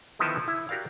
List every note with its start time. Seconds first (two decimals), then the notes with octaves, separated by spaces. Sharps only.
0.19 D3 D#3 F3 B3 D#4 E4
0.48 E4
0.69 F#4 G4 A#4 D5 F5